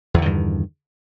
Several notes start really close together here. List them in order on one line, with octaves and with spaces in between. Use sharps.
E2 D3 D#3 G2